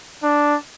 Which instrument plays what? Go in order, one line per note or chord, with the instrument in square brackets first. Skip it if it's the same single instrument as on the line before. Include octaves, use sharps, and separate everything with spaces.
[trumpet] D4